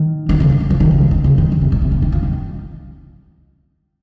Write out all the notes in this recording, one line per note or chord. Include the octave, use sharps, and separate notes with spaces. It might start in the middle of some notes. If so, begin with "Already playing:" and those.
Already playing: D#3
D#3
C#3
F#2
D#3
F3
D#3
C#3
F3
D#3
C#3
D#3
D#3
C3
A#2
C3
C#3
D#3
F3
D#3